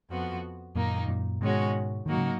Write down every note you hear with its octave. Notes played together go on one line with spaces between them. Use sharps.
F2 F3 B3 F#4
F#2 A#2 D#3 A#3 D#4
F#2 A#2
G#2 B2 D#3 G#3 C#4 F#4
G#2 D#3 F#3 A#3 D#4 F#4
C#3